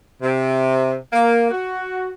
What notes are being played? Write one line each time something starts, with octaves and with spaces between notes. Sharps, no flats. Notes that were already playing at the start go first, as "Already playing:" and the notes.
C3
A#3
F#4